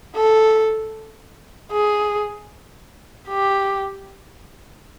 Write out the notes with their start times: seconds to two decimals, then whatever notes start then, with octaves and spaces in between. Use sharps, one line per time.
0.16 A4
1.72 G#4
3.29 G4